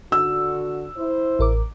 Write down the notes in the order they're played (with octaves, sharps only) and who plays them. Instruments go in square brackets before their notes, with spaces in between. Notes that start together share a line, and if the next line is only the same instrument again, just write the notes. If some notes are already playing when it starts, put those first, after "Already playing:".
[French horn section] D3 F#4 [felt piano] E6
[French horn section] E4 C5
[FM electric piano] A1 A#4 D6